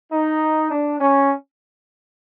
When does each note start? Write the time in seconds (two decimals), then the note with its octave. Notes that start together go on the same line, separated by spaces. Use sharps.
0.12 D#4
0.71 D4
1.00 C#4